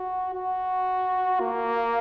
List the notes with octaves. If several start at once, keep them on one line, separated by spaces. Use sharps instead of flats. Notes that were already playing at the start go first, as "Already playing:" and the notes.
Already playing: F#4
F#4
A#3